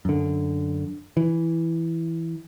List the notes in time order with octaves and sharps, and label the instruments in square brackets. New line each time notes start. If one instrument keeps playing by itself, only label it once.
[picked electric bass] F#2 D3
E3